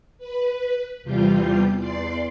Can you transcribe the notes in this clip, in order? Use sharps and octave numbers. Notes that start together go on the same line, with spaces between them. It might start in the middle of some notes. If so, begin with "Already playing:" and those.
B4
E2 C3 G3 F4 G6
E2 D5 C6 C7